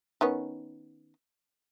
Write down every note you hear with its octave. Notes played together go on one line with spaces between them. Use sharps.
D#3 B3 C#4